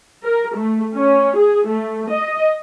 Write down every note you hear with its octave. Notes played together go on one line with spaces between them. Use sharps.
A#4
A3
C#4
G#4
A3
D#5